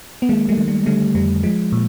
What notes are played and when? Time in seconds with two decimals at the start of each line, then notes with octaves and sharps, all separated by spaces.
0.22 B3
0.29 D#3 G#3 A#3
0.49 G3 A3
0.58 D#3
0.68 G3
0.86 D3 G3 A3
1.15 F2 G3
1.43 F3 G#3
1.72 A#2